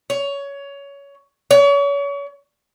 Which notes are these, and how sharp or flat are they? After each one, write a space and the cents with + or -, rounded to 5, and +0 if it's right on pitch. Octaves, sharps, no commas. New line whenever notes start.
C#5 +20
C#5 +35